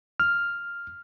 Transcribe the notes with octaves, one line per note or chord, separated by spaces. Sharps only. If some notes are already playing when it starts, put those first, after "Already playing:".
F6